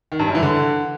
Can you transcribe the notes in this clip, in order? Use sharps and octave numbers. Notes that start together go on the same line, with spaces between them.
D#3
G2
F#2
E3
D3